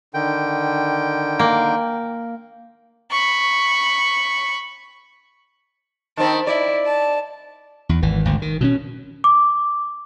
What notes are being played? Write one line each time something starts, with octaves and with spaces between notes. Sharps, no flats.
D3 D#3 G5
A#3
B5 C#6
D#3 C4 A5 B5
E4 D5
A5
E2
G#1 E3
G#1 D2
D#3
B2 F#3 C#4
D6